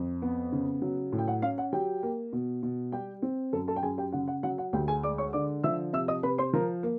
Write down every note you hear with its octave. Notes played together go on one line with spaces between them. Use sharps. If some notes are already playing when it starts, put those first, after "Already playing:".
Already playing: F2
B3
C#3
F#3
A2
G5
F#5
C#4 F5
F#5
F#3 G4 G5
A#3
B2
B2
G3 G4 G5
C4
F#2 A4 A5
A4 A5
G5
F#2 G#4 G#5
G4 G5
C#3 F#5
F#5
F#3 F#5
F#5
D2 G4 G5
G#4 G#5
G#3 D5 D6
C#5 C#6
D3 D5 D6
F3 E5 E6
C3 E5 E6
D#5 D#6
C3 B4 B5
C5 C6
F3 A#4 A#5
A#3